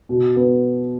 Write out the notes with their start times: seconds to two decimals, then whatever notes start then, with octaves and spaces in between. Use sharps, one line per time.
0.09 B2
0.36 B3